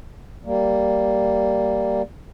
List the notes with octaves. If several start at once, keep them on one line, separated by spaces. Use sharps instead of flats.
G3 A#3